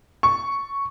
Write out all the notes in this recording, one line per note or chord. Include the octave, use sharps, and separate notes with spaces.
C#6